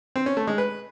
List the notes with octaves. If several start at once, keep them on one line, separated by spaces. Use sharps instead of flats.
C4
C#4
A3
G#3
B4